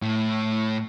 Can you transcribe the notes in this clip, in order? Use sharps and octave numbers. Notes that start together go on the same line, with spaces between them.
A2